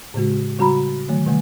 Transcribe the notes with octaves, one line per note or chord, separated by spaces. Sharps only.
A2 C#3 G#3 F#4
C#3 G3 F#4 A#5 B5
D3 D#3 F#3 A3
C3 D#3 G3 A3